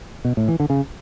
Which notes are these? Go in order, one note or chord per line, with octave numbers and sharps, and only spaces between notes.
B2
A2
E3
D3
C#3